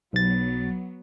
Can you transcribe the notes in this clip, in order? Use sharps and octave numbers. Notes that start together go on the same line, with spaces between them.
B1 F#3 B3 A6